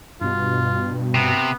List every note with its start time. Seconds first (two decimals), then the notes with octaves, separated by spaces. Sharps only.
0.21 G2 B2 F4
1.15 C3 B3